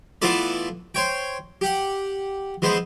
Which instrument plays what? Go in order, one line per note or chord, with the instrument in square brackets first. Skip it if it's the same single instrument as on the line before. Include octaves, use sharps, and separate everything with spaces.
[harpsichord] E3 A3 B3 F4 A4 D5
C5 C#5 G5
G4 F#5
E3 G#3 B3 C5